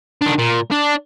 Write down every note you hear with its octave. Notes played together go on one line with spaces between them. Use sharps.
D#3 D4
A#2
D4